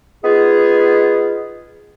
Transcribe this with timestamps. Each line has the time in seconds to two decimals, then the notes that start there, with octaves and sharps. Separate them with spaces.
0.24 B3 D#4 F4 G#4